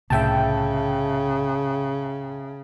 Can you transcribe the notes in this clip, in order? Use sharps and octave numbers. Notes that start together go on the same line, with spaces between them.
C2 A2 C#3 E5 G5 A5